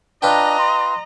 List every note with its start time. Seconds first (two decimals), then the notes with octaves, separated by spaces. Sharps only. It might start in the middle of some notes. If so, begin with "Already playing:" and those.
0.22 D4 F4 B4 D#5 G5 A#5
0.59 C6